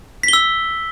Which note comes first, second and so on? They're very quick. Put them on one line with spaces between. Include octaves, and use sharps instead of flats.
B6 G7 E6